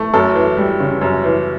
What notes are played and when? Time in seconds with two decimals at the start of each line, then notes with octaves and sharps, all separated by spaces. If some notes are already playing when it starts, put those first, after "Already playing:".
Already playing: A3
0.14 F#2 A4
0.35 E3
0.57 G3
0.80 C#3
1.01 F#2
1.24 E3